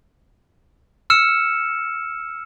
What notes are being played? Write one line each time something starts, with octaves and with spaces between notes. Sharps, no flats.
E6 F6 C#7 E7